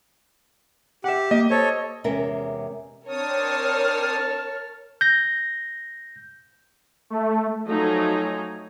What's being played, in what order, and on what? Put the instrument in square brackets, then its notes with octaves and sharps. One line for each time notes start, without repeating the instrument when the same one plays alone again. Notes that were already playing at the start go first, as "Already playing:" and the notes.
[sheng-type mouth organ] G4 [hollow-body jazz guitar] E5 F#5
[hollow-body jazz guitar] A#3 [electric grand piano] D#5
[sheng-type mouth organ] A4 C#5 [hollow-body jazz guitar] C5
[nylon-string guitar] E2 C3 G#3 C#4 A#4 E5
[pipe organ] C4 D4 D#6 [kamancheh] A#4 F6 [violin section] C#5 [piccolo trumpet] A5
[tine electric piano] G6 A#6
[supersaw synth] A3
[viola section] F3 F#3 A3 D#4 G#5 A#5